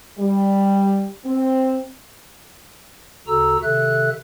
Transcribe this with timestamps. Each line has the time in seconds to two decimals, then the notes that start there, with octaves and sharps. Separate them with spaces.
0.18 G3
1.25 C4
3.27 D2 C#3 F#4 A4 A#5 E6
3.63 C3 D#3 A4 E5 F#6